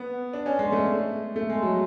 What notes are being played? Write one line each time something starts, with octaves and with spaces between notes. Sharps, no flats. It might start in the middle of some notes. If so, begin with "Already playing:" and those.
Already playing: B3
D4
C#4
G#3
A3
A3
G#3
F#3